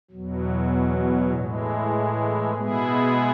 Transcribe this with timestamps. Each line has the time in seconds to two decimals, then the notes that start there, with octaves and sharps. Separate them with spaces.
0.11 E2 B2 F#3
1.31 A2 E3 G#3
2.53 B2 G#3 B3 E4 G#4